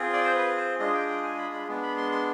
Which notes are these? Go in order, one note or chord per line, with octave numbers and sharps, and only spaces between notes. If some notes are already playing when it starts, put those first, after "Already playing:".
Already playing: C4 F4 G#4
D5
C5
B4
C5
G#3 D4 F4 G#4 D#5
G5
G5
G#5
B5
B5
G#3 B3 D4
B5
C6
C6